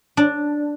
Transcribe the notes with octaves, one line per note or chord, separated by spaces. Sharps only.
D4